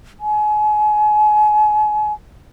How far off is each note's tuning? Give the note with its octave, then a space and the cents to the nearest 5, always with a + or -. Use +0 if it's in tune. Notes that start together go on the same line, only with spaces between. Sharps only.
G#5 +35